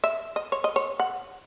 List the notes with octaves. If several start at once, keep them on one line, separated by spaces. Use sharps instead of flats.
E5
D#5
C#5
D#5
C#5
F#5